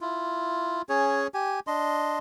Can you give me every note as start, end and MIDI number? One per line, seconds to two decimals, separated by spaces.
0.01 0.82 64
0.01 0.82 65
0.89 1.27 61
0.89 1.27 68
0.89 1.27 73
1.34 1.60 67
1.34 1.60 80
1.67 2.19 62
1.67 2.19 75
1.67 2.19 84